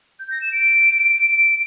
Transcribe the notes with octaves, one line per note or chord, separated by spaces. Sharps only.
G6
A#6
E7
D7
D7